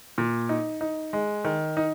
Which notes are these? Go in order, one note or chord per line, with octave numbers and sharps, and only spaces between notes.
A#2
D#4
D#4
G#3
D#3
D#4